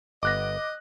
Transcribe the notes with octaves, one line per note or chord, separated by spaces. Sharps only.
G1 B3 D#5 D6 F#6 A#6